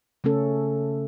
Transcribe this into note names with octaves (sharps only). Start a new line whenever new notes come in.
C#3 A3 C#4 A4